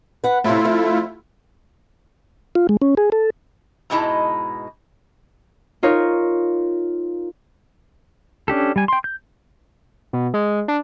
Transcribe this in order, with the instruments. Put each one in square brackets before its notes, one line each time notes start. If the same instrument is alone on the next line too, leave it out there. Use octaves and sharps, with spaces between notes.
[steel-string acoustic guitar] B4 F#5
[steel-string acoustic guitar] A2 C3 [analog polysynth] A3 E4 F4
[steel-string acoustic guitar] F2
[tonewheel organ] F4
G#3
C#4
G#4
A4
[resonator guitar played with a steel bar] G#2 B2 G#3 D#4 E4 A5
[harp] D#4 F4 A#4 C#5
[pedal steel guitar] C#4 D4 G4 A4
G3 G#5
G5 C6
G6
[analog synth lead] B2
G#3
D4